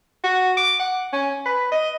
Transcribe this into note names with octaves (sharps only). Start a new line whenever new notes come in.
F#4
D6
F#5
C#4
B4
D#5